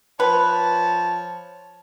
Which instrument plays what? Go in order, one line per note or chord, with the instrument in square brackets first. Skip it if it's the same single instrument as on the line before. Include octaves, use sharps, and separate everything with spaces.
[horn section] F3 C#5 A5 [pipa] B4